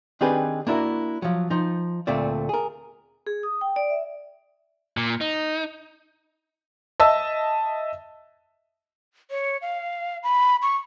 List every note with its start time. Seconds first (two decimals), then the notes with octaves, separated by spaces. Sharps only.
0.21 D#3 C4 D4 G4 G#4 B4
0.67 A#3 D4 E4 F#4 A#4
1.22 F3 F#3
1.51 F3 D#4
2.07 D2 A#2 A3 C4 D5
2.49 G#4 A#4
3.27 G#4
3.43 D#6
3.61 G5
3.76 D5
3.90 E5
4.97 A#2
5.21 D#4
7.00 D#5 E5 A5 E6
9.30 C#5
9.62 F5
10.23 B5
10.62 C#6